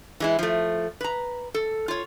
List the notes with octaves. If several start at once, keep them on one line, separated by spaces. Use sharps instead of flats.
E3 G#3 E4
F3 A3
B4 A#5
A4
F4 C#5